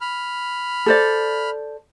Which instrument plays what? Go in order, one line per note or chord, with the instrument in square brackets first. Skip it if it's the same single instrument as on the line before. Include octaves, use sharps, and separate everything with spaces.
[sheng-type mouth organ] B5 F6
[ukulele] A4 C5 D5